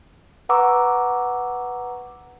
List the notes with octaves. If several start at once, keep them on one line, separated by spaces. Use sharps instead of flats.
B4 F#5 A#5 C#6 D6 E6